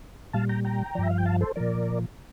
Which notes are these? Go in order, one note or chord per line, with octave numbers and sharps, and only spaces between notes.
A#2 G3 F5 A5
G5 A#5
G5 A#5
G2 F3 D5 E5
F5
G5
F5 A5
A4 C5
A#2 F3 A#4 D5